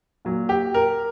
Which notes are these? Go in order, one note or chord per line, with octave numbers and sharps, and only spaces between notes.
A#2 F#3
G4
A#4